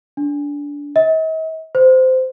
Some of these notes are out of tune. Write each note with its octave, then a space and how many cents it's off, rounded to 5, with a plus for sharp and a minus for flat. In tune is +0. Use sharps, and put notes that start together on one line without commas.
D4 -20
D#5 +45
C5 -15